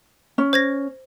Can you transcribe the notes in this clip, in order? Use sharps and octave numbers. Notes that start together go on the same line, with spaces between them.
C#4
C5 G#6 A#6